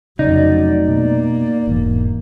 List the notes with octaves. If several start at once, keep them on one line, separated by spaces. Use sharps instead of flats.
F1 C#3 F#3 D#4 D5
B2 A#3
E1 G#2 E3